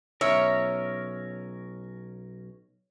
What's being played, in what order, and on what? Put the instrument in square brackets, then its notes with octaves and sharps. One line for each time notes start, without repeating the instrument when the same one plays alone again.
[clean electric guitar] B1 C#4 A#4 [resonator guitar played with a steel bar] C#5 [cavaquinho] E5